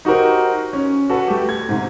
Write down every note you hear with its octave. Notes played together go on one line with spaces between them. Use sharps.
D#4 F#4 G4 A#4 C5
C#4
F#4 A4 B4
A3 G4
G#6
G#2 C3